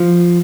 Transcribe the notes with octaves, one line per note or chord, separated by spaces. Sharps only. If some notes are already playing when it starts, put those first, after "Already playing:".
Already playing: F3